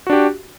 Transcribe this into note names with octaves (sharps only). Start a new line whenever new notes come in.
D4 F#4 G4